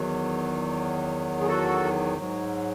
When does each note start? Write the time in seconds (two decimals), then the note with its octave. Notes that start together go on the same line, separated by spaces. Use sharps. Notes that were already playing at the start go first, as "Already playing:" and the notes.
Already playing: E2 D#3 F#3
1.41 G#4
1.47 F#4 A4
2.17 G#2 F#3